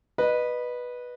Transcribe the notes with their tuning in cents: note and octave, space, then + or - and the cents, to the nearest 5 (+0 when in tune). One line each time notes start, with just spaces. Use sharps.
B4 -10 D#5 -25